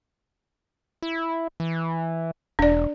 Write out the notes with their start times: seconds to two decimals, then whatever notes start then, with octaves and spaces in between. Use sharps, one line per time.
1.02 E4
1.60 E3
2.59 E1 D4 D5